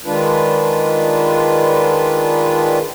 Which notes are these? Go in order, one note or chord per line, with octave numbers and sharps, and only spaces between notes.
D#3 G#3 D4 F4 B4